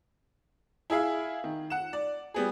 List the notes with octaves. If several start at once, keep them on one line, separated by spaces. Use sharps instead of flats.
E4 G#4 E5 F5
D#3
F#5 E7
D5
G3 B3 G#4